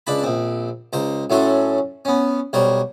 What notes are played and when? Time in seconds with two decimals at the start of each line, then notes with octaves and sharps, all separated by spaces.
0.07 C#2 D4 A5 B5
0.23 A#1 C4
0.93 C#2 C5 A#5
1.30 A2 F#3 A3 C#4 A4 C6
2.05 B3 C#4
2.53 B1 G3 A#4 C5 C#5